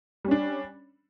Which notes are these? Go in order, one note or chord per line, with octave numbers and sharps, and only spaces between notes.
G3 C#4 D4